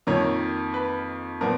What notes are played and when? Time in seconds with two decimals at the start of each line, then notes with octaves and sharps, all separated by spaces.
0.07 F2 D#3 A#3 A#4 C#5
0.74 B4
1.41 A#2 F3 B3 A#4